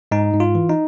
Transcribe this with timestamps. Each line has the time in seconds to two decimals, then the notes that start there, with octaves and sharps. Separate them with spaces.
0.11 G#2 D#4
0.34 G#2
0.40 F4
0.55 E3
0.69 D#4